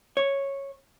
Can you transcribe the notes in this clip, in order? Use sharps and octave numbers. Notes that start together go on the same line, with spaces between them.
C#5